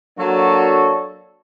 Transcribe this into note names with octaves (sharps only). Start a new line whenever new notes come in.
F#3 A#3 D4 F#4 A4 C#5